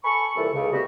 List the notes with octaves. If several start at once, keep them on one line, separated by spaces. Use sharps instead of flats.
A4 G#5 B5 C#6
C2 A#2 E3 A4
C#2 C#3
G3 A3 B3 C4 F#4 G4